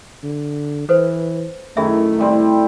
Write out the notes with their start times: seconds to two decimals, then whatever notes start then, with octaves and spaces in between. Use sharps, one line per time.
0.23 D3
0.89 E3 A4 B4 C5
1.77 F#2 D#3 A3 E4 G#4 E5
2.19 A2 G3 C4